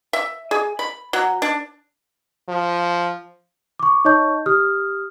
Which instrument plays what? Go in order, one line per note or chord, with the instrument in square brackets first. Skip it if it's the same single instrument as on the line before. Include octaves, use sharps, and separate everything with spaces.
[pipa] E5
G#4
B5
F#3
D4
[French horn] F3
[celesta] C#6 D6
D#4 C#5 D#5 A5 C#6 G6
G4 D#6 F6